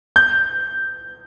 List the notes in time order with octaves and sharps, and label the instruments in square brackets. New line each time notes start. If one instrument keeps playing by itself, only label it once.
[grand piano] G6